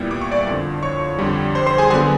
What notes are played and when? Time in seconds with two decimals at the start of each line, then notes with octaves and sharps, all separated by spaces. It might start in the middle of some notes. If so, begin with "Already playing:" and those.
Already playing: A#2 G3 B3 E4
0.11 D6
0.21 C#6
0.32 D5 D6
0.47 F2 D3 F3
0.83 C#5 C#6
1.19 F2 D3 G3
1.55 C5 C6
1.67 C5 C6
1.78 G#4 G#5
1.90 D3 F#3 B3 G#4 G#5